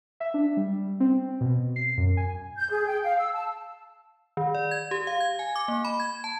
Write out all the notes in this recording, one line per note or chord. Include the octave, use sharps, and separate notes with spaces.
E5
D4
G3
C4
B2
C7
F#2
G#5
G6
G#4
G5
F5
E6
A5
D#3
D5
G#6
G4
F5
G#6
G#5
D6
A#3
B5
G#6
A5